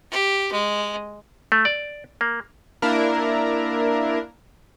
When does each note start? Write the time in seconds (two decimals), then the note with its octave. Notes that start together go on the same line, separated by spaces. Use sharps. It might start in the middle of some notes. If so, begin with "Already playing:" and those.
0.11 G4
0.52 G#3
1.52 A3
1.65 D5
2.21 A#3
2.82 A#3 D4 E4 A#4